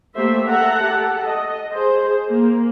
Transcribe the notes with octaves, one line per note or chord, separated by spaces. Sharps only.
A3 A#3 G4 C5 E5
A4 E5 F#5 A#5
G4 A4 A5
D#5
G#4 C5
A#3